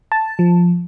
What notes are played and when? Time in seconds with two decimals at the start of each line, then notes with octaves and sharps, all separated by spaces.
0.12 A5
0.39 F3